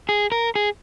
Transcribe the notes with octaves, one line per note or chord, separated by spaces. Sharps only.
G#4
A#4
G#4